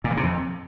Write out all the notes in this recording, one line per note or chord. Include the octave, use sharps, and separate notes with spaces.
A#2
E3
C3
F2